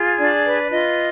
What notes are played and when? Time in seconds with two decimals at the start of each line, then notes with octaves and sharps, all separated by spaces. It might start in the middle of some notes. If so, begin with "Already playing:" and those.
Already playing: F4 G#4
0.18 D4 D5
0.45 B4
0.72 F4 D#5